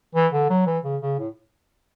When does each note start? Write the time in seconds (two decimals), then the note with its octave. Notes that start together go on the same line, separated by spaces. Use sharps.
0.15 E3
0.33 D3
0.50 F#3
0.66 E3
0.84 C#3
1.01 C#3
1.19 A2